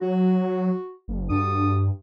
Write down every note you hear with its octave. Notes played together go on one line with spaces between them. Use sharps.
F#3 F#4
F#1
G2 F#4 A4 D#6